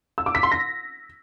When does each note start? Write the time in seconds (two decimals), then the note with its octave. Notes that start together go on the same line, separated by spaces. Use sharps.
0.18 E6
0.26 D6
0.35 B6
0.43 C6
0.52 A#6